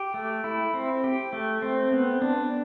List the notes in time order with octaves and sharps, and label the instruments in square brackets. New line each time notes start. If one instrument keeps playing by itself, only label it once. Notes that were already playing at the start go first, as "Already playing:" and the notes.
Already playing: [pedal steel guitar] G4
A3
E4
C4
G4
A3
C4
B3
D4